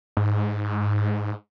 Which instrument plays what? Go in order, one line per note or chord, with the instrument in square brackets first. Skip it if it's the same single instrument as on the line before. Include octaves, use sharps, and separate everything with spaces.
[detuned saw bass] G#2